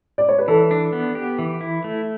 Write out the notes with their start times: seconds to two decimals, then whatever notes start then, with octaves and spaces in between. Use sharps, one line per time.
0.18 D5
0.29 C#5
0.38 B4
0.48 E3 A4
0.71 D4
0.93 B3
1.15 G4
1.39 E3
1.61 E4
1.84 A3